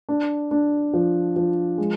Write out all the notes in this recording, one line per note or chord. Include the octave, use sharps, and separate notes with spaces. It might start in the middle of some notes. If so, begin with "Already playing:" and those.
D4
D4
F3
F3
G#3